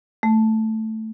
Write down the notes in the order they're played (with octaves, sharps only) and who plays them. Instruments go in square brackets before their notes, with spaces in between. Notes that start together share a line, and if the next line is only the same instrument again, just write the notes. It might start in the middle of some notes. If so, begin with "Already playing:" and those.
[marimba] A3